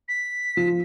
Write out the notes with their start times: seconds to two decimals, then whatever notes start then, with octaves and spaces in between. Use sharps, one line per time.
0.08 B6
0.57 F3